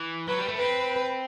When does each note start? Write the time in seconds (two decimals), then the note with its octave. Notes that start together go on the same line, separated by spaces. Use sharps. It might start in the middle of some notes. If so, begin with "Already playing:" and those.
Already playing: E3
0.28 F#3 B4
0.38 G3
0.48 A3
0.58 C4 B4